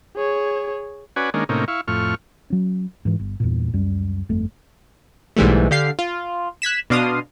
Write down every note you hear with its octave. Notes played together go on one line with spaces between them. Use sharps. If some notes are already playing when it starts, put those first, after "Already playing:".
G#4 C#5
C#4 F#4 B4 D5 G#5
D#3 G#3 A#3 C#4 D4
A2 C3 A#3 C#4 D#4
E4 F5 C#6
F2 A2 C#6 F6
F#3 C#4
G#2 E3
G1
E2 G2 A#2
C#2 F#2 G3
G1 F2 A3
B1 G#2 E3 G3 A3
D3 G4 F5 C7
F4
F#6 G#6 B6 E7
B2 D4 F5 C6 D#6